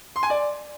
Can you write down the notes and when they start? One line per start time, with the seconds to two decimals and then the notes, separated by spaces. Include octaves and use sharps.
0.16 C6
0.23 G#5
0.30 D5